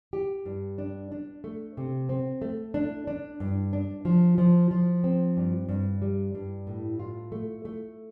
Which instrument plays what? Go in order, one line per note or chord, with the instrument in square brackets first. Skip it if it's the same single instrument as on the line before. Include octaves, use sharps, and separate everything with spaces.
[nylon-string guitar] G4
G2
D4
D4
A3
C3
C4
A3
D4
D4
G2
D4
F3
F3
F3
C4
G2
G2
G3
G2
A2
F4
A3
A3